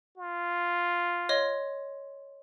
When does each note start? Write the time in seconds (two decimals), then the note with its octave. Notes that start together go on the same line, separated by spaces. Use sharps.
0.18 F4
1.29 C#5 D#5 C6